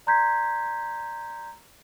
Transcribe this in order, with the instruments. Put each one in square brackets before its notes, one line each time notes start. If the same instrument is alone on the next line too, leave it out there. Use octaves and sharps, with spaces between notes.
[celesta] D5 A#5 C6 G6 G#6 B6